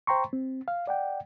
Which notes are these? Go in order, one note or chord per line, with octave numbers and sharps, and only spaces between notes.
C5 G5 A#5 C6 C#6
C4
F5
D5 F#5 G5